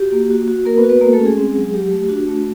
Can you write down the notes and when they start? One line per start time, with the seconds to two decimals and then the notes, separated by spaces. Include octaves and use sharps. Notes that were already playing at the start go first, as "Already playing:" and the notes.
Already playing: F#4 G4
0.12 A#3
0.30 F#4
0.48 F#4
0.66 A#3 F#4 A#4
0.78 B3 B4
0.83 F#4
0.89 B3 B4
1.01 G#3 A#3 A#4
1.13 A3 A4
1.20 C#4
1.25 G#3 G#4
1.38 C4
1.55 F#3
1.74 F#3 G4
1.91 A3
2.09 D4 F#4
2.27 A3